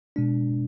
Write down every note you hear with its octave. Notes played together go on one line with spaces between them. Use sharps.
B2 G#3 D4